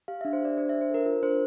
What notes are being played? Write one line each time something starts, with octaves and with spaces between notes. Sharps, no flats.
G4 F5
E5
D4
C5
G4 D5
D4 C5
E5
D4
C5
A4 A#4
F4 A#4
D4 C5